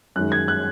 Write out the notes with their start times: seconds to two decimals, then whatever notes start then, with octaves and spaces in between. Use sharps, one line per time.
0.16 F#2 D#3 G#3 F#6
0.32 G#6
0.48 F#6